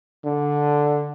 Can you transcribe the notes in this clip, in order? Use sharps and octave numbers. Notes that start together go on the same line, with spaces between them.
D3